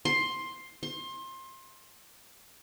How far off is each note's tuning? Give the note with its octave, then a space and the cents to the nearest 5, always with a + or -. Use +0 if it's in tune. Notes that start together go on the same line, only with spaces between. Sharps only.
C6 +10
C6 +25